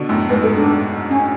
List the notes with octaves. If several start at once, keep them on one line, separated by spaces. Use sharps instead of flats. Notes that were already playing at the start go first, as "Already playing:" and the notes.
Already playing: B2 D3
F#2 A2
G#2 B4
A4
D4
C#4